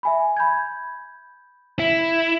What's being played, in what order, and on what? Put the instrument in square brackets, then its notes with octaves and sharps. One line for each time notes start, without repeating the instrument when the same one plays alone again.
[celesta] E5 G#5 B5
B5 G6 G#6
[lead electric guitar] E4